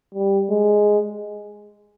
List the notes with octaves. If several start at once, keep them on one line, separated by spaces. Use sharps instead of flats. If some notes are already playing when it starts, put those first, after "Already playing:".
G3
G#3